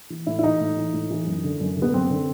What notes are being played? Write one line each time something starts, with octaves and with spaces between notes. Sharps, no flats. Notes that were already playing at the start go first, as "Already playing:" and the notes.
E3
A2 E4
E4
E3 D#4
A2
E3
A2
E3
F#2
D3
F#2
D3
B3
F#2 C4
D3